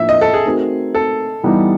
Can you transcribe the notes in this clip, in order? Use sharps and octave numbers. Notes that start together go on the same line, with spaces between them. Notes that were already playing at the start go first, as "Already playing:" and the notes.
Already playing: A2 F3 A#3 D4 E5
D#5
A4
G#4
A3 C4 D#4 F#4 A#4
A4
E3 G3 B3 D#4 G4